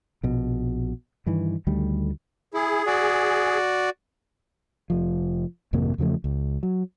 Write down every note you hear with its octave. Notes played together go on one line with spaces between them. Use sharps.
A#1 B2
G2 D#3 E3
D2 D#3 G3 A3
E4 G#4
F#4 D5
F1 F3
G#1 F2 C3 A#3
E2 C#3 F3 A3
C#2
F#3